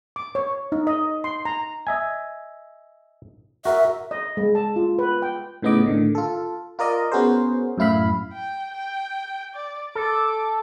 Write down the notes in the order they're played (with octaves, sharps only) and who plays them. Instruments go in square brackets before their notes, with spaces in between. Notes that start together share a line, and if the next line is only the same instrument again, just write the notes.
[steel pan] D6
C#5
D#4
D#5
C6
A#5
[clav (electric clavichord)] D#5 E5 G#5
[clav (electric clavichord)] F#4 A#4 [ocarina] E5
[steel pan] D#5
G#3
A5
F4
B4
G5
[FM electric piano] A2 C#3 B3 D#4 D#5 D6
A2 D3 D#3
F4 A4
F4 A#4 D5 D#5
B3 C#4 F#4 G#4 A#4 C5
F#2 A2 E4 F5 B5
[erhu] G5
G5
D5
[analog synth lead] A4 [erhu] D6